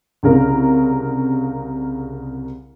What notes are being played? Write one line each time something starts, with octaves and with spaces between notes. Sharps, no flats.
C2 C#3 A#4